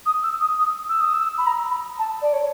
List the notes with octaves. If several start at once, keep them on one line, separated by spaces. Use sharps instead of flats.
D#6
E6
D#6
D#6
E6
D#6
E6
B5
A#5
B5
A5
D5
C#5